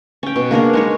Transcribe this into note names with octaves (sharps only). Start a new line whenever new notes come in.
C#4 G5
B2
A#3 D4 G#4 A#4
G#3 D#4 C#5